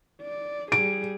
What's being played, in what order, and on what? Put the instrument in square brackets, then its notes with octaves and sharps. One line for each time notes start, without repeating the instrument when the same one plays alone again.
[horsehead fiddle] D5
[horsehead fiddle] G3 G#4 [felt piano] D7